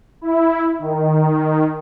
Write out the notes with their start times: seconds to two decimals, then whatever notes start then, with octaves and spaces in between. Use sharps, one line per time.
0.21 E4
0.79 D#3